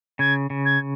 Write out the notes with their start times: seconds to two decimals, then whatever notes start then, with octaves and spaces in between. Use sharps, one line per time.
0.19 C#3 G#6
0.50 C#3
0.65 G#6